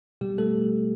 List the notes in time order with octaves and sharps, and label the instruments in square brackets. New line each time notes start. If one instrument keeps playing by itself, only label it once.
[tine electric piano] B2 G3 G4
B2 A3 A4